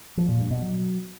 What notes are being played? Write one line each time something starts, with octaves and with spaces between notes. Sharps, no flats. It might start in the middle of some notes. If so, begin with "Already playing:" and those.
F3
A#2
G2
B2
F#3